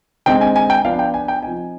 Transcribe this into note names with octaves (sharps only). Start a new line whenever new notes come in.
D3 G#3 C4 D#4 G5
G#5
G#5
G5
F3 B3 D4 F5
G5
G#5
G5
F3 C4 D#4 G#5